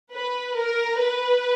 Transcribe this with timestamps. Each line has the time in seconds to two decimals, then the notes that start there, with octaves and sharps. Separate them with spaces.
0.12 B4
0.56 A#4
1.01 B4